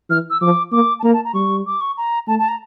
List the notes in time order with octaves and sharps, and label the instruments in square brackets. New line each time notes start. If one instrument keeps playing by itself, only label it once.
[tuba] E3 [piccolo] F6
[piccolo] E6
[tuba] F3 [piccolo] D6
[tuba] A#3 [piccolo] D6
[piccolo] A5
[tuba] A#3 [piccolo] A#5
[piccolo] A5
A#5
[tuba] G3 [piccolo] C#6
[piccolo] D6
C#6
A#5
[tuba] A3 [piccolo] A5
[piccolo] A5
A#5